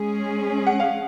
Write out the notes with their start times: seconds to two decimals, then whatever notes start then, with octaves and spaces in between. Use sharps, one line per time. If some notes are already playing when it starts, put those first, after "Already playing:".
Already playing: G#3 C#4 G#4
0.67 F#5
0.80 F5